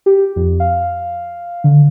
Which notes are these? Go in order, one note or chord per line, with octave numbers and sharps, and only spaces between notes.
G4
F2
F5
D3